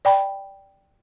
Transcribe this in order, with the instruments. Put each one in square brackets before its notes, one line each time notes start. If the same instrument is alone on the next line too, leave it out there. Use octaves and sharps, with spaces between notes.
[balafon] D5 G5 B5